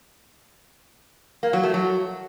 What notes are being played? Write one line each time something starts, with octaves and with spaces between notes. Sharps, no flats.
A#3
F#3
A3
F#3